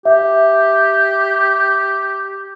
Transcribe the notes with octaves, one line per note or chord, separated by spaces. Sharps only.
G4 E5